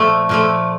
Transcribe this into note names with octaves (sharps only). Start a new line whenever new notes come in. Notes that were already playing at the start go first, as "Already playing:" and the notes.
Already playing: A#2 F3 A3
A#2 F3 A3